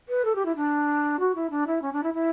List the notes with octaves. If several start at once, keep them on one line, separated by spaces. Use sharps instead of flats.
B4
A4
G4
E4
D4
F#4
E4
D4
E4
C#4
D4
E4
E4